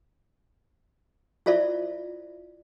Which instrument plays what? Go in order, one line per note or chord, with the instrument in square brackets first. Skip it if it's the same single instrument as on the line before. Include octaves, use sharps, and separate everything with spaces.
[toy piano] E4 F4 C5 D5 E5